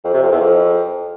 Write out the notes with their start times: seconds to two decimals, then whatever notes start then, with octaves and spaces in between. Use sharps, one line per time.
0.04 F2
0.13 C3
0.22 F2
0.32 E2
0.41 F2